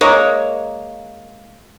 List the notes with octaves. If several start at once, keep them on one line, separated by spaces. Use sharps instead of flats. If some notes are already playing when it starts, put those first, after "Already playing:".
G#3 A#3 C#5